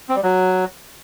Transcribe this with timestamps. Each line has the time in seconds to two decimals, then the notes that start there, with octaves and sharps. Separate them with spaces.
0.09 C4
0.16 G3
0.23 F#3